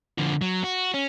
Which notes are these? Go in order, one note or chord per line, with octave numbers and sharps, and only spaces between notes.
D3 F3
F#3
F#4
C#4